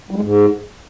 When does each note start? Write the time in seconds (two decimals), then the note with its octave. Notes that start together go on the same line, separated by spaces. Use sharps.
0.11 G3
0.16 G#3
0.21 G#2